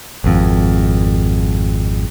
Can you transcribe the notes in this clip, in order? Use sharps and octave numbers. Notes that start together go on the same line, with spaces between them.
G#1 F2